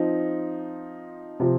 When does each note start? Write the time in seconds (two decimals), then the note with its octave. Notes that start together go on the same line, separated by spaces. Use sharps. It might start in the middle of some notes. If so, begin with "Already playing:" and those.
Already playing: F3 C4 D#4
1.40 C3 F3 C4